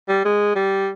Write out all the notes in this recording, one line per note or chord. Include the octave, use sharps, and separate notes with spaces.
G3
G#3
G3